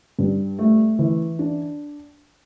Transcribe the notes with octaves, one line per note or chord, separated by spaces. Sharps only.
G2
A3
E3
D4